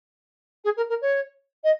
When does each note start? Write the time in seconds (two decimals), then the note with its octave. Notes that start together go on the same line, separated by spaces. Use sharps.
0.64 G#4
0.76 A#4
0.89 A#4
1.01 C#5
1.64 D#5